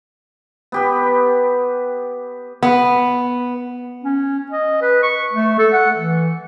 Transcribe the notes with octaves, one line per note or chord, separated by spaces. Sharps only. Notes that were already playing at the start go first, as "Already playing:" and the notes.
B3 G4 B4
B3
C#4
D#5
B4
C#6
A3
A4
F#5
E3